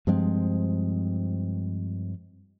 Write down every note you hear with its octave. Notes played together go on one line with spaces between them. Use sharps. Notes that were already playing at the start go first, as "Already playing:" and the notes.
G2 F3 G#3 C4